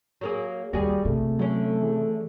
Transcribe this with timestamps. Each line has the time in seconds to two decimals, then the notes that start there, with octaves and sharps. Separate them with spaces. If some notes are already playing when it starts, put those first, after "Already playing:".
0.21 F#3 A#3 G#4
0.73 D#2 G3 A#3 F#4 G#4
1.05 C3 A3
1.39 D3 F#3 C#4
1.82 E3 G#4